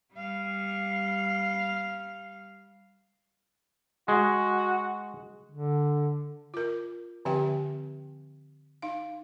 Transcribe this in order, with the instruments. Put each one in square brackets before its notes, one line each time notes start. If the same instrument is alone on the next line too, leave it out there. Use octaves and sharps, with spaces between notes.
[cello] G3 F5
[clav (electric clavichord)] G#3 [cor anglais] F#4
[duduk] D3
[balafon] F4 A#4
D3 F3 C4 G4 E5 G5
D#4 F5